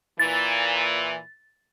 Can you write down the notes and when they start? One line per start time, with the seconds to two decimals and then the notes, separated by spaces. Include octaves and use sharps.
0.19 A#2 E3 A6